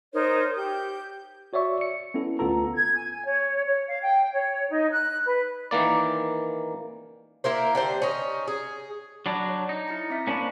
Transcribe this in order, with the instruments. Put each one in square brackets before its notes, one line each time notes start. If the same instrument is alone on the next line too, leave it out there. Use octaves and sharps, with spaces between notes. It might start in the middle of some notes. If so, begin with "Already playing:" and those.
[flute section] D#4 A#4 C5 C#5
G4 G6
[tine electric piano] F#4 C#5 D5 E5 C#6
C#7
B3 C#4 E4 A4
D2 B3 F4 A4 A#5
[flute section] G#6
G#5
C#5
C#5
F5
G5
C#5
D#4
F#6
B4
[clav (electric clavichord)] D#3 E3 A#3 D5
[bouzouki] A#3 E4 A#4 C5
D3 G4 C5
C#4 D#4
G#4
[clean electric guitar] F#3 D4 [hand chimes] B5
[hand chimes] C#5
[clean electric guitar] D#4
[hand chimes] E4 A#5 C#7
C4 E5 B6
[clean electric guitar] A#3 C#4 D4 [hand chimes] C5 B5